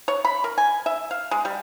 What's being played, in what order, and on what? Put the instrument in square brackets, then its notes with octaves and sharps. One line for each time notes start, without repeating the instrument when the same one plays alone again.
[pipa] C#5
B5
A#4
G#5
E5
F5
G#3
G3